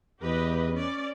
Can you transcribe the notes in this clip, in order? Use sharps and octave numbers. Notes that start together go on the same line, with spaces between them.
E2 G4 B4 D#5
C#4 D5